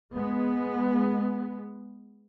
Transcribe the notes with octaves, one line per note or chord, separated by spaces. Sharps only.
G#3 B3